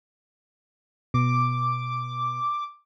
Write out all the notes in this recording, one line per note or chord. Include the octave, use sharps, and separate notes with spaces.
B2 D6